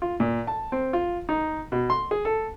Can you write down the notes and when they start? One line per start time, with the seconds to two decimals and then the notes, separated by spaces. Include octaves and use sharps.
0.02 F4
0.20 A#2
0.47 A5
0.72 C4
0.93 F4
1.29 D#4
1.72 B2
1.90 C6
2.11 G#4
2.25 A4